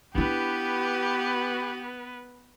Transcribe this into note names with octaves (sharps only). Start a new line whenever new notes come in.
B3 D4 E4 G4 B4